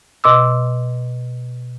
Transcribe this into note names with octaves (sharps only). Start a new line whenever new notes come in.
B2 D#5 C6 D6 E6